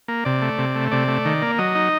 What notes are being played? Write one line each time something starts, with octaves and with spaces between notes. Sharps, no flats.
A#3
C3 D5
A3
C3
A3
C3 D5
A3
D#3
A#3
F#3 D#5
D#4